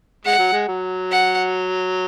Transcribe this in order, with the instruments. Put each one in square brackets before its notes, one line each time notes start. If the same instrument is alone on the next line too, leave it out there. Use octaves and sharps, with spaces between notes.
[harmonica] G#3 [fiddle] F#5
[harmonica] F#3
G#3
F#3
[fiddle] F#5